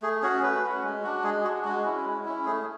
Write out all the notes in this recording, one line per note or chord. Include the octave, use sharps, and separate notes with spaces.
A3 G#4
C#4 F#4 G#4
A3 B4
C#4 F#4
G#3
D4 F#4
G#3 G#4
D4 F#4 G#4
G#3 F#4
C#4 E4
G#3
C#4 E4
A3 G#4